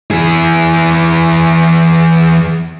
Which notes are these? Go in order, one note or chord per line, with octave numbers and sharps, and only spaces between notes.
E3 G#4